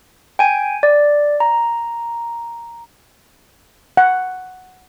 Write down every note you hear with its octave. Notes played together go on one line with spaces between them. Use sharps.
G5 G#5
D5
A#5
F#5